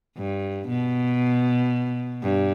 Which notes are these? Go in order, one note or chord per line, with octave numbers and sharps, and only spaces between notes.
G2
B2
G2